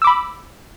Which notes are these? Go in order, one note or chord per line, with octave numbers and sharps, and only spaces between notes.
B5 D6 E6